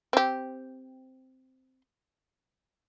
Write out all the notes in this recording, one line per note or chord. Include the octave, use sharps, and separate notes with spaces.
C4 G4